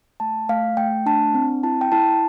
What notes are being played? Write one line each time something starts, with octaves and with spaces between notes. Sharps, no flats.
A3 A5
A3 F5
A3 G5
D4 A5
C4
E4 A5
G5
E4 A5